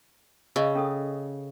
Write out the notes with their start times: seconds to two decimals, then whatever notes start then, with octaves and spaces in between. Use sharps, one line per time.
0.56 C#3 D#5 C#6 E6
0.75 C#4 A4 D#6